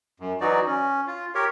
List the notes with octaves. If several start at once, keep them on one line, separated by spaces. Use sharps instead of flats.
F#2
E3 F#3 D#4 F#4 D5
C#4
F4
G4 A#4 C#5